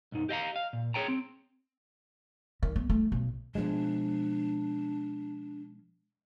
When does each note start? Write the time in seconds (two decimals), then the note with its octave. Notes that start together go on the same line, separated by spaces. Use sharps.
0.12 B1 F#2 D#4
0.29 G4 D#5 F5 A#5
0.56 F5
0.73 A#2
0.94 G#4 C#5 G5 A#5
1.08 C4
2.63 D#3
2.76 B3
2.90 A3
3.12 B1
3.55 B2 F3 G#3 D4